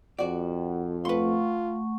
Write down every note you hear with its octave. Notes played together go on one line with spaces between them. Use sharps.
F2 F#4 D5 F#5
A3 F4 B4 F#5 C6 C#6